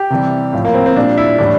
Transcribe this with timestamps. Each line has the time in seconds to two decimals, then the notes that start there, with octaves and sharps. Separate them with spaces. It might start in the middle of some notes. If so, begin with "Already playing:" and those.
Already playing: G4
0.10 C3 E3 G3
0.53 A2 F3
0.65 A#3
0.74 C4
0.86 C4
0.96 A#2 G3 D4
1.17 E4
1.38 A2 E3 G3 D4